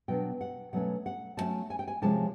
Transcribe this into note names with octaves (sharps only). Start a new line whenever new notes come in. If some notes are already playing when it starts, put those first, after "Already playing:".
B2 F#3 B3 D4 G5
F#5
B2 F#3 A3 C#4 F#5
F#5
B2 F#3 A3 C#4 A5
G#5
G5
G#5
C3 F3 G#3 C#4 A5